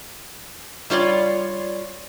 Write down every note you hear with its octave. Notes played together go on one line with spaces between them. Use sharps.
G3 F4 C#5 D5